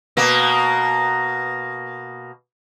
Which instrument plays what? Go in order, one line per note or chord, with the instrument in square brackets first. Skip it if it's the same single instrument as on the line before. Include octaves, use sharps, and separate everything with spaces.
[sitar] B2 A#3